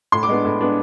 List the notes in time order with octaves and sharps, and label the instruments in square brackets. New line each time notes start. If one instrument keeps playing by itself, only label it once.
[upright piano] A2 C6
D6
G#3 B3 D4
A2
G#3 B3 D4